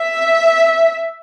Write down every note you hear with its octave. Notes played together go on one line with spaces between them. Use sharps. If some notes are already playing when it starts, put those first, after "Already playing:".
Already playing: E5